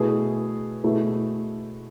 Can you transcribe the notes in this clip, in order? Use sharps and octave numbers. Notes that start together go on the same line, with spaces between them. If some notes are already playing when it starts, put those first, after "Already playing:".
Already playing: B2 A3 E4 G#4
B2 A3 E4 G#4